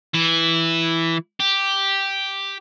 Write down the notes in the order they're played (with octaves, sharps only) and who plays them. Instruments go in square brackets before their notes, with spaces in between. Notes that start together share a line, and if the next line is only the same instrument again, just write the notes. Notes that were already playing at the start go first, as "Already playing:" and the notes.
[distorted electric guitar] E3 E4
G4